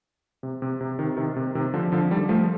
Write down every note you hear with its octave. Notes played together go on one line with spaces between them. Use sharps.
C3
C3
C3
C3 D#3
C3 D#3
C3
C3 D#3
D3 F3
D3 F3
D#3 G3
F3 A3